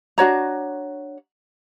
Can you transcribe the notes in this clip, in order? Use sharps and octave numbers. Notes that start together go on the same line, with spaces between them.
D4 F#4 C#5 A#5